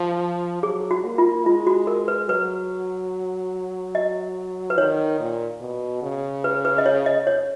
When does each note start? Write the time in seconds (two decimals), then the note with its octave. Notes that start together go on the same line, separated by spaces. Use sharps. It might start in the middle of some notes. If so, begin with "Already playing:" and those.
Already playing: F3
0.63 F#3 G#4
0.91 F#4
1.04 A#3
1.18 F4
1.46 G#3 F4
1.67 F#4
1.87 A#4
2.08 B4
2.29 F#3 B4
3.95 D#5
4.70 B4
4.78 D#3 C#5
5.20 A#2
5.61 B2
6.02 C#3
6.44 B4
6.65 B4
6.78 D#5
6.86 C#5
7.06 D#5
7.27 C#5